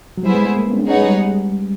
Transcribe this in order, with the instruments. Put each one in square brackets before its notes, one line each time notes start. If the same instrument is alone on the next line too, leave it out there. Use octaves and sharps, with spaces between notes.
[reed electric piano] F#3
[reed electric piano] G3 [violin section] B3 E4 G#4 C5
[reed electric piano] G#3
A3
A#3
B3
C#4
D4
[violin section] B3 D#4 G#4 C#5 F#5 [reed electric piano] C#4
[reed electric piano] G#3
G3